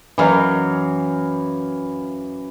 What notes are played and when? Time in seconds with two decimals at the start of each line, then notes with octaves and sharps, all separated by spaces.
0.18 F#2 E3 F#3 F5